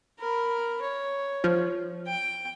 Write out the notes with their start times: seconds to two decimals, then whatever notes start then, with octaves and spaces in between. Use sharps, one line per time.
0.19 A#4 B5
0.81 C#5
1.44 F3
2.07 G5